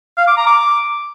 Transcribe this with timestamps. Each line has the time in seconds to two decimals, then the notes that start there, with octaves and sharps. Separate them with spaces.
0.18 F5
0.27 D6
0.37 A#5
0.47 D6